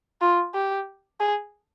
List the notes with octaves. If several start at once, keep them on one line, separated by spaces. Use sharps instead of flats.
F4
G4
G#4